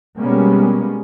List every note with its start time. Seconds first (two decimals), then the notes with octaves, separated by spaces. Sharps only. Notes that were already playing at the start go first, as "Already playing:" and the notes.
0.18 B2 G3 G#3 A#3 B3 C#4